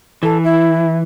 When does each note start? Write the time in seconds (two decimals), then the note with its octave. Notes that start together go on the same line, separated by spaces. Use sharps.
0.23 E3 A4
0.43 E4